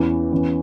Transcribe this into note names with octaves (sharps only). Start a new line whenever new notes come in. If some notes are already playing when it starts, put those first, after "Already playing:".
Already playing: E2 E3 C#4
E2 E3 C#4